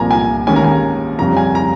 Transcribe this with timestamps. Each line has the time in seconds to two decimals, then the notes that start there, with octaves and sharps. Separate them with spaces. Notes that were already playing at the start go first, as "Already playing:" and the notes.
Already playing: C2 A#2 F3 G#5 A#5
0.11 G#5
0.47 D#2 D#3 G#3 C#4 G#5
0.56 A#5
0.64 G#5
1.19 F2 C#3 G3 C#4 A#5
1.37 G#5
1.55 A#5